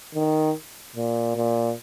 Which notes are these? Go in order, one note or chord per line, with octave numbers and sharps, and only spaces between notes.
D#3
A#2
A#2